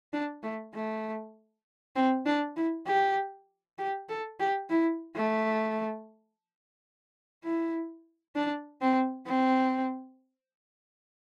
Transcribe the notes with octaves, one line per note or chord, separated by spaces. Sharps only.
D4
A3
A3
C4
D4
E4
G4
G4
A4
G4
E4
A3
E4
D4
C4
C4